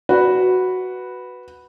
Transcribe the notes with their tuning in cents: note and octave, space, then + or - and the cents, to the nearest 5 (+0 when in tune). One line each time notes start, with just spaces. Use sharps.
F#4 +0 B4 +0